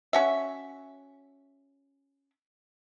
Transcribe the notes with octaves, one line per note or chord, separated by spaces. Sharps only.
C#4 F#4 E5